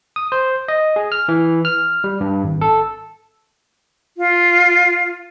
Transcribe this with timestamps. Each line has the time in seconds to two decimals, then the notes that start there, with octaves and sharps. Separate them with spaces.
0.16 D#6
0.32 C5
0.68 D#5
0.96 G#4
1.12 F6
1.29 E3
1.65 F6
2.04 G3
2.21 G2
2.44 G#1
2.61 A4
4.17 F4